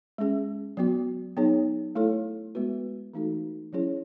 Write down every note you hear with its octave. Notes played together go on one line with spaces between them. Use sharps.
G#3 C#4 G#4
F#3 B3 F#4
F#3 B3 D#4 G#4 C#5
A3 E4 A4 C#5
G#3 B3 F#4 B4
E3 A3 D#4 F#4 A4
F#3 C#4 E4 G#4 C#5